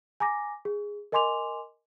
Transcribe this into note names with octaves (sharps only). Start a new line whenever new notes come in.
G#5 A#5 D6 A#6
G#4
A#4 D#5 G#5 C6 D6 F7